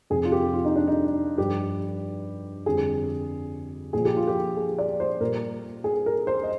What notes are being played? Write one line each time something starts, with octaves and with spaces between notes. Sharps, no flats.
F2 C3 F3 G#4
F4
G4
F4
D#4
D4
D#4
G2 F3 G4
F2 D3 G3 G#4
A#2 F3 G#4
G4
F4
G4
G#4
D5
C5
A#2 G3 A#4
G#4
A#4
C5
D#5